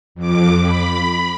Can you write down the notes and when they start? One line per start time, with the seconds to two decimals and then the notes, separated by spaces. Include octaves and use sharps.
0.15 F2 D6
0.61 B5